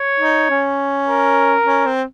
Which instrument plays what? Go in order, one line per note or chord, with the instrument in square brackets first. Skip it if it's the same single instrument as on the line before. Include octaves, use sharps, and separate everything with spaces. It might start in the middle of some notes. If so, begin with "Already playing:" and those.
Already playing: [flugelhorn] C#5
[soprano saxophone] D#4
C#4
[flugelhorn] A#4
[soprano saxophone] C#4
C4